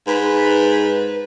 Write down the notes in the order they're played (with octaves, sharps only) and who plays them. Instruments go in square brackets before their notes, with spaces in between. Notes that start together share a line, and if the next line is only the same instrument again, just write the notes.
[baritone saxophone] G#2 [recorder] B4